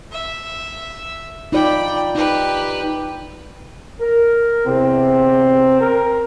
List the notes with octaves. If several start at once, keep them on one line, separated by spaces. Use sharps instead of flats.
E5
D#4 F4 D5 G5 B5
D#4 G4 B4
A#4
E2 C3 C4
A#4